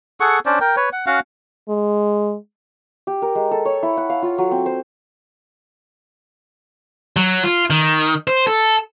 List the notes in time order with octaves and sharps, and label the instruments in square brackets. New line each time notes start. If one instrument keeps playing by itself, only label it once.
[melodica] G#4 A4 F#5 C#6
C#4 D4 C5 D5
A#4 G5
B4 C#5
F#5
C#4 F#4 F5 F#5
[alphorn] G#3
[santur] G4
A#4
G#3
A4
C#5
E4
F#5
F5
F4
F#3
C4
C5
[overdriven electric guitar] F#3
F4
D#3
C5
A4